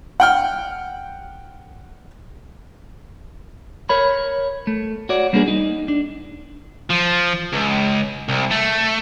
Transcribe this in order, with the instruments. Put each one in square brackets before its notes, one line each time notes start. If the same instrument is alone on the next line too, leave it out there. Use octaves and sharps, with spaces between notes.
[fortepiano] F#5 G5 F6
[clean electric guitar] A#4 C#5 B5
A3
F#4 C#5 D5
G3 A#3 B3 D4 F#4 G#4
D#4
D4
[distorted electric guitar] F3
C#2
C2
A3